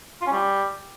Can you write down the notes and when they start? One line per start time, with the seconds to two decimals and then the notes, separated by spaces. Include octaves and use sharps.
0.21 F4
0.27 C#4
0.32 G3